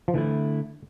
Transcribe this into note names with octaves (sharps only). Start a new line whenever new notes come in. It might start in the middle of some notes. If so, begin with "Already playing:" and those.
F3
D3 E3 A3 E4